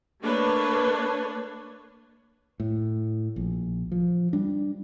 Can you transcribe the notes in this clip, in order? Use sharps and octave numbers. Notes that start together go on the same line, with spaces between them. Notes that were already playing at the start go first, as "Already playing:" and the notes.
A3 A#3 D4 B4 C#5
A2
A#1
F3
G3 D4